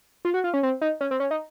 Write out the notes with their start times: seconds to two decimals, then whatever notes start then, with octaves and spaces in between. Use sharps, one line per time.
0.25 F4
0.34 F#4
0.44 F4
0.54 C#4
0.63 C4
0.81 D#4
1.01 C#4
1.11 C4
1.20 C#4
1.31 D#4